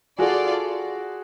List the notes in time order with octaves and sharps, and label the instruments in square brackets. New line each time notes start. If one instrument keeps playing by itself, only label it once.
[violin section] F4 A4 D5 [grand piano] F#4 G#4